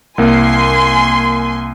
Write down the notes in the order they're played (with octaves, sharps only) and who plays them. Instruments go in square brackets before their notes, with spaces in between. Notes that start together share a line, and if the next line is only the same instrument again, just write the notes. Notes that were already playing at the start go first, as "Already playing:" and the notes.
[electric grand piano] C2 A#3 [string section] G#5 C6